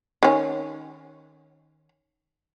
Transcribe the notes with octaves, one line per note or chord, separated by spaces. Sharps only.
D#3 C#4